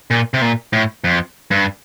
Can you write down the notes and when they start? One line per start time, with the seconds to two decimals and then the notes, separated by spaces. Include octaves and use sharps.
0.10 A#2
0.34 C3
0.42 A#2
0.73 A2
1.04 F2
1.51 G2